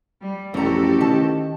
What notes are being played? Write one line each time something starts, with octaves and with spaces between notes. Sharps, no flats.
G3
A1 F2 F#4 G4 A4 A#5
D#3 A5